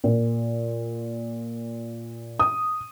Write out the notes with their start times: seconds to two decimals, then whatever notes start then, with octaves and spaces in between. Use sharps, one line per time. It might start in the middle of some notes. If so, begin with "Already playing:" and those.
0.04 A#2
2.40 D#6